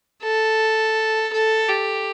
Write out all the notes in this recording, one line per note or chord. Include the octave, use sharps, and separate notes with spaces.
A4
A4
G4